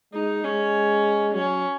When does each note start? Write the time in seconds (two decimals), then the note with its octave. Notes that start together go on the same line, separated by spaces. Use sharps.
0.14 G#3 D#4
0.44 G#3 C#4
1.34 F#3 C#4